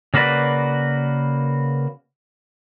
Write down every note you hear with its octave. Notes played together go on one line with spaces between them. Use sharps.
C#3 A#3 F#4 B4 D5